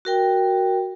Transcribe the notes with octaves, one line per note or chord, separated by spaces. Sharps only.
F#4 A#4 G5